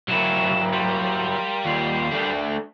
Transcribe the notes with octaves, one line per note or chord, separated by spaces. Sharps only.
C3 F#3 A3 E4 A#4 F5 G5 E7
G3 C6
D#2 F4 C7
A3 D4